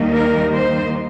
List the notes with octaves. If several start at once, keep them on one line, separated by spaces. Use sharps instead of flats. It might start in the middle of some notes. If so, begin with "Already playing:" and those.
Already playing: D#2 D#3 G3 A#3 D#4
A#4
C5